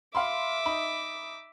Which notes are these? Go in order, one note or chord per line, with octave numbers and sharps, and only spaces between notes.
E5 F5 B5 C6 D6
D#4 B5